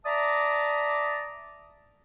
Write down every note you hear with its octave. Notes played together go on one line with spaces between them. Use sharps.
D5 E5 A5 A#5 D6 D#6